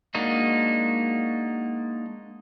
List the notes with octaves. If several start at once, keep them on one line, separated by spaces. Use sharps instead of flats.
G#3 A#3 D4 D#4 F#4